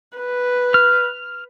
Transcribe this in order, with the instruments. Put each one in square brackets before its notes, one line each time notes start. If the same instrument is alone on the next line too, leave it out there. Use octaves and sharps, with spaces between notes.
[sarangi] B4
[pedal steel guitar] F6